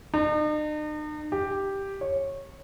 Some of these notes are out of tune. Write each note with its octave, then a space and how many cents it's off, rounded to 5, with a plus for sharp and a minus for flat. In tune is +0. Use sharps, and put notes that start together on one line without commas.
D#4 -45
G4 +0
C#5 -15